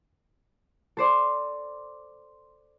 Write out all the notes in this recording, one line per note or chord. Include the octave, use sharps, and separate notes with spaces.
A4 C5 D5 C6